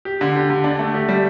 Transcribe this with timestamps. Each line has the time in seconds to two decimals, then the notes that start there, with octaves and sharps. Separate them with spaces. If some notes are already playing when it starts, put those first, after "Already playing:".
0.05 G4
0.21 D3
0.35 G4
0.50 D3
0.64 D4
0.79 A3
0.94 G4
1.09 G3